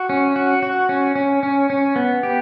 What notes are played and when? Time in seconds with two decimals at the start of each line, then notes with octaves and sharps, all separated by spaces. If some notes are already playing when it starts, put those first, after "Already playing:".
Already playing: F#4
0.09 C#4
0.36 F#4
0.63 F#4
0.89 C#4
1.16 C#4
1.43 C#4
1.70 C#4
1.96 B3
2.23 G4